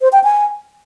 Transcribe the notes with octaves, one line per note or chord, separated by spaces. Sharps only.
C5
G5
G#5